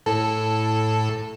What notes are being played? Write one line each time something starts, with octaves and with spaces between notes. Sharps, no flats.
A2 A4 A5